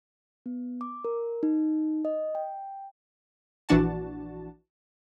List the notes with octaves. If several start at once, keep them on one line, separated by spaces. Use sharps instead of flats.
B3
D6
A#4
D#4
D#5
G5
A#1 E3 D4 F#4 A5